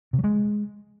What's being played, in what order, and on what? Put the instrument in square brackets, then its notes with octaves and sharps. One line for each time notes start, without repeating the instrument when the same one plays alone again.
[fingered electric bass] C3
F#3
G#3